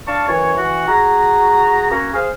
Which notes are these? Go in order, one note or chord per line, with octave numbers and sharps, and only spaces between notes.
D4 D5 F5 A5 C#6
F#2 E3 E4 C#5
E3 F#4
F#4 G#4 A#5
A#3 C#4 F#4 A#5
G#4 C5 F5